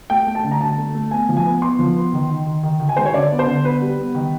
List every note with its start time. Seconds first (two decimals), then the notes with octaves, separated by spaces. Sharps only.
0.10 A3 G5
0.27 A3
0.35 A5
0.44 D3
0.51 A#5
0.61 D3 A5
0.78 A3
0.95 A3
1.11 B3 G#5
1.29 F3
1.37 G#5
1.45 B3
1.62 B3 C6
1.79 F3
1.96 B3
2.13 D#3
2.30 D#3
2.46 D#3
2.63 D#3
2.80 D#3
2.89 G#5
2.96 G#3 C5
3.06 C#5
3.14 D3 D5
3.31 B3
3.39 C5
3.47 D3
3.64 B3 B4
3.82 G3
3.98 B3
4.14 D#3